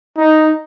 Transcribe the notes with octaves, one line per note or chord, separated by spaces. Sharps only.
D#4